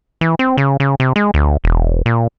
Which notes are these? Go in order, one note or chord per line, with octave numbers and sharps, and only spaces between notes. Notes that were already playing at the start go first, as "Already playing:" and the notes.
E3
C4
C#3
C#3
C3
G#3
D2
E1
A#2